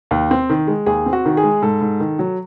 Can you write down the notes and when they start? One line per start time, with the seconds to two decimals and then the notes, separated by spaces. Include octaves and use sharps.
0.11 D#2
0.31 C4
0.50 D#3
0.67 G#3
0.86 D#2 G#4
1.06 C4
1.13 F#4
1.25 D#3
1.37 G#4
1.43 G#3
1.62 G#2 A4
1.81 G#2
2.00 D#3
2.19 F#3